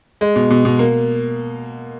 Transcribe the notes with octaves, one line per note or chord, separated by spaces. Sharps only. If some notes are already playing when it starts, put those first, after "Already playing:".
G#3
B2
B2
B2
A#3